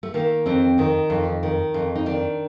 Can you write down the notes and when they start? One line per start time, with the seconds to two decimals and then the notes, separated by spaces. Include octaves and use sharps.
0.03 A3
0.14 D#3 A#3
0.46 F2 C4
0.78 D#3 D#4
1.10 F2
1.43 D#3
1.74 F2
1.95 D#4
2.06 D#3 D4